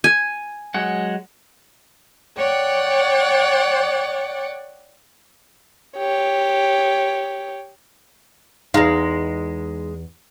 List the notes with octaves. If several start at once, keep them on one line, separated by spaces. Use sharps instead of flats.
G#5
F#3 G#3 F#5
C#5 D5 F#5 G5
G4 C#5
E2 G#3 D#4 F5 A#5 A#6